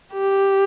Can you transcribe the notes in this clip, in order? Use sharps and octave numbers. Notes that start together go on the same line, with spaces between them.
G4